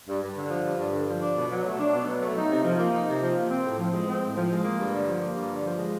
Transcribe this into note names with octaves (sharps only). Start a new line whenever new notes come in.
G2
G2
D3
F3
G2
G2
D3
F3
D4
B2
F#3
A3
D4
B2
F#3
A3
D#4
C3
F3
A#3
D#4
C3
F3
A#3
C4
A2
F3
G#3
C4
A2
F3
G#3
A#3
G2
D3
F3
A#3
G2
D3
F3
G#3